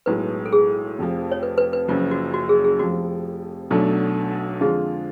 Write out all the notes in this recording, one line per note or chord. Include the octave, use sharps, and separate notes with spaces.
B1 A2 G#3 B4
A4
G#4
F1 F2 F3
C#5
B4
B4
B4
F#1 F#2 F3 F4
F#4
F#4
G#4
G#4
F1 F2 F3 F#4
B1 B2 F#3 A3 D4
F2 D3 G#3 D4 F4 G#4